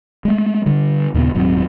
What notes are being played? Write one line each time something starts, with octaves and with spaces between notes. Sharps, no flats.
G#3 A3
D3 G3
D#2 A#2 C#3 B3
D#1 G#2 F#3 C4